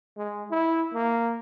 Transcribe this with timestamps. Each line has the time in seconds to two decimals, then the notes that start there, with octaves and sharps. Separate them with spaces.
0.17 G#3
0.51 E4
0.94 A#3